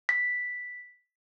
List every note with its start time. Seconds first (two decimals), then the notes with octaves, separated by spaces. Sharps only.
0.09 B6